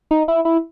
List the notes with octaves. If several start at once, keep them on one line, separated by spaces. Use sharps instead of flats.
D#4
E4
E4